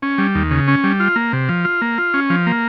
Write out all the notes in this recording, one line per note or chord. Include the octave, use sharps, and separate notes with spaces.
C#4
G3
D#2
C#3
C#4
G3
F4
A#3
C3
F3
F4
A#3
F4
C#4
F3
A#3